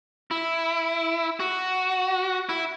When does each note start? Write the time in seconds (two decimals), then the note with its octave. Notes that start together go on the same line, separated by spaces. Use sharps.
0.31 E4
1.40 F#4
2.49 E4